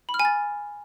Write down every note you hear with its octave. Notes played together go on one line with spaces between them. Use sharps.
B5
F6
G#5
A6